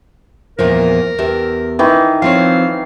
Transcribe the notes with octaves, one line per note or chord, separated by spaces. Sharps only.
E2 A#2 F3 A#4
E2 G4 E5
D#3 E3
F3 C4 C#5 F5